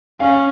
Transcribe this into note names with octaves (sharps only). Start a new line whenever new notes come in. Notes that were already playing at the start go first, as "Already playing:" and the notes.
C#4 F5